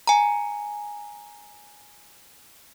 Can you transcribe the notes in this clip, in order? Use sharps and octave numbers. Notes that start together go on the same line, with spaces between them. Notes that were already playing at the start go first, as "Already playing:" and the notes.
G#5 A#5